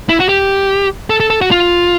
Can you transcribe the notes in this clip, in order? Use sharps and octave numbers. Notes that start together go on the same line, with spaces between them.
E4
F#4
G4
A4
A4
A4
F#4
F4